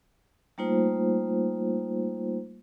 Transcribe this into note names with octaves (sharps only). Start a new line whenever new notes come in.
G3 A3 A#3 D#4 F4 C5